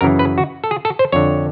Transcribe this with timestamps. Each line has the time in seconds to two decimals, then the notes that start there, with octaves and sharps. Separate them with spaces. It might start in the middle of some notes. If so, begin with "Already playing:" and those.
0.01 F#2 C#3 E3 A#4
0.19 B4
0.38 F#4
0.64 A4
0.71 G#4
0.85 A4
0.99 C5
1.12 F2 D3 C#5